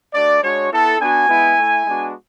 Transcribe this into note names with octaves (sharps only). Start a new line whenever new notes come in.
A3 D4 F#4 D5
G#3 D4 F#4 C#5
B3 E4 A4
B3 D4 F#4 G#5
G#3 B3 E4
A3 E4
G#3 B3 D4 F#4